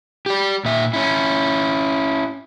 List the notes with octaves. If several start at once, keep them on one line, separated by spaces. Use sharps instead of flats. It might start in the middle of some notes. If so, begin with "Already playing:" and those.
G4 D5
A#2 E5
C#4 E4